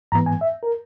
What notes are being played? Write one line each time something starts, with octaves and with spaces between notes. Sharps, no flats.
G#2 E3 B3 A#5
G#5
E5
A#4